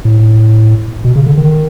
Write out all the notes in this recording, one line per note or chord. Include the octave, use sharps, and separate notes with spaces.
A2
B2
C#3
D3
D#3